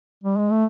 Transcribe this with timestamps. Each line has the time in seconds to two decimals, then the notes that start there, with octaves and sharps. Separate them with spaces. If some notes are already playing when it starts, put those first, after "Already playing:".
0.24 G3
0.38 G#3
0.51 A3